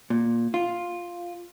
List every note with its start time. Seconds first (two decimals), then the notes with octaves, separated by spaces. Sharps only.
0.10 A#2
0.54 F4